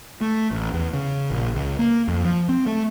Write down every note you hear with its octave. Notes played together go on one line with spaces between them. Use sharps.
A3
A1
E2
C#3
A#1
C#2
A#3
F2
F3
C4
A3